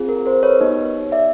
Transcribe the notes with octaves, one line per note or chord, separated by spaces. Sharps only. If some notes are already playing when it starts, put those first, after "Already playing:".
Already playing: C4 F4 G#4
A#4
A#4 C5
B4 C#5
B3 D#4 G4 C#5 D#5
D5 E5